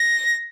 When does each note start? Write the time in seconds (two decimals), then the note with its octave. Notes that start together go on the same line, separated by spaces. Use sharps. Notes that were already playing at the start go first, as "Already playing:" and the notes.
Already playing: A#6